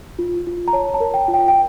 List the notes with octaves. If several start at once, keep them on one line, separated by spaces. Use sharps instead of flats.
F4
F4
A#5
C#5 A5
A5
A#4
G5
F4
G5
G5